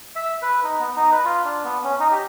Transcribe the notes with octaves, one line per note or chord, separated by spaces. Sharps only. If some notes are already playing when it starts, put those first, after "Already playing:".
E5
B4
D#4
B3
D#4
B4
F4
D4
B3
C#4
D#4
G4